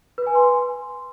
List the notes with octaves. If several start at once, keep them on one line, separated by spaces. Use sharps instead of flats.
B4
G#5
C6